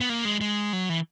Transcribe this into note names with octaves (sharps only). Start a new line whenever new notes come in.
B3
A#3
G#3
G#3
F#3
E3